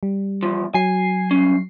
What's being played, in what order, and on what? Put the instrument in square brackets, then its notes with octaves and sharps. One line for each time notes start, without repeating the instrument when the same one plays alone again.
[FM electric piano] G3
[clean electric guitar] E2 F3
[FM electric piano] F#3 C7 [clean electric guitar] G#5
[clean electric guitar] C2 C#4